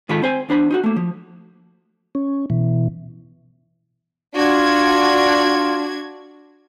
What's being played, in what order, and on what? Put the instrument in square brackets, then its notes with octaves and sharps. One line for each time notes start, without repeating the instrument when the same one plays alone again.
[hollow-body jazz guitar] G#2 D#3 G#3 F4 A4 B5
C4 C5 G#5
E2 D4 C5 B5
D#4 F4 F#4
A3 A#3
F3
[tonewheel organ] C#4
B2 E3
[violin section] D4 F#4 G#6 [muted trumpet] F4